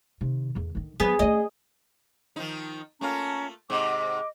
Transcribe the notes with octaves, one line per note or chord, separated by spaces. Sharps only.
C3 D#3
E2 D3
D3 D#3
F#3 B3 G#4
A3 C#4 D#5
D#3 F3 D#4
A3 A#3 C#4 F4 A5 A#5
G#2 C3 D#5 D6